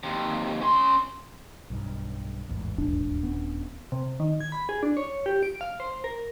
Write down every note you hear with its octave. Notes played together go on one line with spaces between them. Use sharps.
D#2 C3
C#4 C6
B1 G2
A1 E2 G#2
D#1 D4
B3 C#4
C3
D#3
G#6
B5
G#4
D4
C#5
G4
D7
F5
C5
A#4